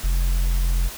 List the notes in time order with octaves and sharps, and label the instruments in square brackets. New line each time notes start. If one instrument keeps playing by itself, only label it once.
[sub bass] F1